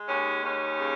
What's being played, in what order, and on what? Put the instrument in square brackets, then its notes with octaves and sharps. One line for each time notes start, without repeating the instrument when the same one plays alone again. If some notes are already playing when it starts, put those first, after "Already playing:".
Already playing: [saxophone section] G#3
D#2 C#4
D#2 C#4
C#3